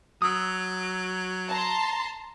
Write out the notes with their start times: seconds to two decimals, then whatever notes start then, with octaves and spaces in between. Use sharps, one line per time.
0.22 F#3 D#6 E6
1.49 A5 A#5 C6